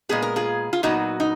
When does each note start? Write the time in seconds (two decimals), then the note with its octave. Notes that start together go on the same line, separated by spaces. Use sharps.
0.09 A#2 G#3 B3 G#4
0.22 A#4
0.36 F4 G#4
0.73 F4
0.83 A#2 F#3 B3 D#4 F#4
1.20 D#4